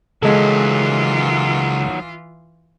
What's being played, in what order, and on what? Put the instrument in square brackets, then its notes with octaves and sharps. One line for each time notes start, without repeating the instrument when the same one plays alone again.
[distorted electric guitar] C#2 [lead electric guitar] D#3 F#3 [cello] E3 F4 [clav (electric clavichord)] G#3 A4